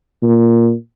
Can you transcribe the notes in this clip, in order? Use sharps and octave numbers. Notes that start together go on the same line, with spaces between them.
A#2